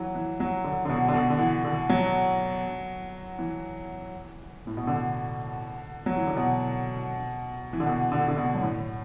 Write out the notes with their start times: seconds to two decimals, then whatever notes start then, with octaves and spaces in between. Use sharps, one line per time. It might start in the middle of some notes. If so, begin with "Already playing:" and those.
Already playing: E3 F#3
0.15 E3
0.40 F#3
0.64 D3
0.85 D3
0.89 B2
1.08 D3
1.14 B2
1.30 D3
1.39 E3
1.65 D3
1.89 F#3
3.39 E3
4.67 A2
4.77 B2
4.87 D3
6.06 F#3
6.17 E3
6.27 D3
6.37 B2
7.73 E3
7.80 D3
7.86 B2
8.12 D3
8.28 D3
8.37 B2
8.55 F#2
8.62 A2